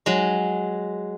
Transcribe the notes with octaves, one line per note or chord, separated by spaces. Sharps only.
F#3 G#3